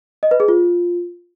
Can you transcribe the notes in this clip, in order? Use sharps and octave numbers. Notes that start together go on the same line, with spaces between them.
D#5
B4
G#4
F4